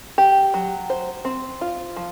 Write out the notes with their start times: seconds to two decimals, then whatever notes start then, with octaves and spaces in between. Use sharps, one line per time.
0.18 G4
0.54 F#3
0.90 C5
1.25 C4
1.61 F4
1.96 F3